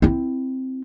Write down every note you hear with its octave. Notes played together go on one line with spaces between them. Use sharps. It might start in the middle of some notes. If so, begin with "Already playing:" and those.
C4 E4